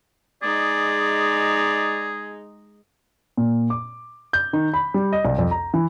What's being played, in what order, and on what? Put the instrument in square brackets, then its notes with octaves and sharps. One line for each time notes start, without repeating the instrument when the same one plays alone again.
[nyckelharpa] G#3 D#4 [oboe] G#4 [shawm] D5
[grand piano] A#2
D6
G6
D#3
B5
G3
D#5
C2
F2
A#5
E3